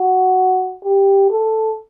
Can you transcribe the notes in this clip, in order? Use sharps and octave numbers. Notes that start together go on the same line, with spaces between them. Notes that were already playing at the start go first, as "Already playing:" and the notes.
Already playing: F#4
G4
A4